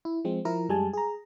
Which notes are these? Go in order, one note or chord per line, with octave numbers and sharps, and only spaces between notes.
E4
F3 G#3 C4
F3 E4 A#4 A#5
F#2 G3 G#3 G#5 A5
G#4 A#5